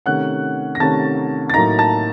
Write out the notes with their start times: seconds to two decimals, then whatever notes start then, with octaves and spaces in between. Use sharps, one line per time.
0.06 C3 D#3 A3 C#4 F#5 F#6
0.75 A#6
0.80 C3 D#3 A3 C#4 A5 A6
1.50 A6
1.54 A2 F#3 A#3 D#4 A#5 A#6
1.79 A5 A6